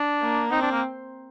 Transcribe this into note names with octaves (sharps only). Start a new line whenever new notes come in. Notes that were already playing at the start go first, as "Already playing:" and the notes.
Already playing: D4
A#3
C4 D#4
D4
A#3